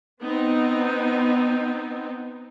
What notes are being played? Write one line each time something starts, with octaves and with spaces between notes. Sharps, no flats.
B3 C4 D#4